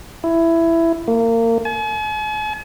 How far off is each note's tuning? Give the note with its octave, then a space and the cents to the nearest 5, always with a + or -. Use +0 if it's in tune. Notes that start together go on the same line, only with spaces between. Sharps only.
E4 +10
A#3 -30
G#5 +45